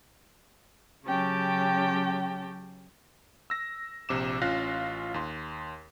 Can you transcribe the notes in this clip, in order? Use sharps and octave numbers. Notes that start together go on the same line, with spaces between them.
C#3 F#3 C#4 G4 G5 A5
E6 A#6
A#1 C3 D6 E7
A1 C#4 F4 F5 F#6 A#6
D#2 C6